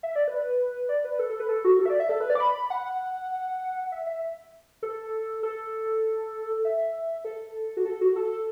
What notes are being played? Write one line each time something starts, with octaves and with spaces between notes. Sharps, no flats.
E5
D5
B4
D5
B4
A4
A4
B4
A4
F#4
A4
E5
D5
E5
A4
B4
D5
D6
B5
F#5
E5
E5
A4
A4
E5
A4
F#4
A4
F#4
A4